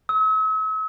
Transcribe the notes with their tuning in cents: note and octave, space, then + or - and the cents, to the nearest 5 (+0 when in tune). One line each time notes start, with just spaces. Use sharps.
E6 -45